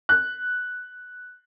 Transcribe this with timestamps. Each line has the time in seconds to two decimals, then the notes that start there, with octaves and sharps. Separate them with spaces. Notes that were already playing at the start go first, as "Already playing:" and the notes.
0.09 F#6